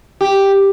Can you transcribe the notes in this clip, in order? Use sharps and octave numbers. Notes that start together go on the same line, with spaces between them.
G4